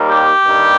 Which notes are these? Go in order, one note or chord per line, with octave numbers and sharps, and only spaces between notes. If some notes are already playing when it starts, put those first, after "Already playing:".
Already playing: D#2 D#3 G3 A#3
G4
G2 D#3 G3